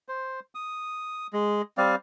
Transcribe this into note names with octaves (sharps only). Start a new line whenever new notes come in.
C5
D#6
G#3
G3 C4 D5 F5